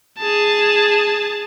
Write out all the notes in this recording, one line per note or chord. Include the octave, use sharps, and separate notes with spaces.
G#4 A5